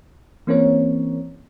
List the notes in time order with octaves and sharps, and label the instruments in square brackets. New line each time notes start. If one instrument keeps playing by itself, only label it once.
[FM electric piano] E3 A#3 C4 C#4 A#4 C#5